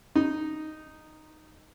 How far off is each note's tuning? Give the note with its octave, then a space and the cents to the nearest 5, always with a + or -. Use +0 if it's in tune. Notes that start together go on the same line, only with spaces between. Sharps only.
D#4 -5